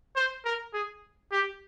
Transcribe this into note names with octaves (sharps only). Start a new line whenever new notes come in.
C5
A#4
G#4
G4